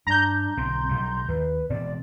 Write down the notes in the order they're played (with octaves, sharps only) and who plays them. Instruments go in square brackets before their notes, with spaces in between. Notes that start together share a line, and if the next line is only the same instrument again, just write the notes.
[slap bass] G2 [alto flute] D4 [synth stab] A#5 G6
[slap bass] B1 D3 C4 [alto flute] C6
[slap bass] B1 G3
[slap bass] D#2 [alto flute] B4
[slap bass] E1 B2 C4 [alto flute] D5